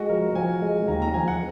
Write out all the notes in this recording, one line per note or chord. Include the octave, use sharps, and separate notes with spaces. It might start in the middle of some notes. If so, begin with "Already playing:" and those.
Already playing: G#3 F#4
F3 A#4
F3 G#5
G#3
D#2 A#5
A#5
F3 G#5
F#5